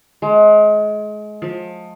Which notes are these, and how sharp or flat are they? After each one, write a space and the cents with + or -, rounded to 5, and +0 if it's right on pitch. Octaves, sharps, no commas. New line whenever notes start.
G#3 +30
F3 +30